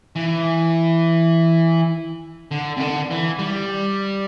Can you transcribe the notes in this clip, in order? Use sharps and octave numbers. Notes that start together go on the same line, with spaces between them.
E3
D3
C3
D3
E3
G3